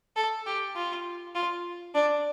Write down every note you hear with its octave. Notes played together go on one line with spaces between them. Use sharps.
A4
G4
F4
F4
D4